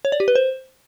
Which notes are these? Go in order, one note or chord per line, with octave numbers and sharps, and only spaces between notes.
C#5
D5
G4
B4
C5